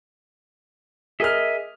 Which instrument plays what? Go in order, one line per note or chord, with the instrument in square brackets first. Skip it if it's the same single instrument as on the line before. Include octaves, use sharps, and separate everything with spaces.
[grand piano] G#4 A#4 F6 [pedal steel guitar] D#5 E5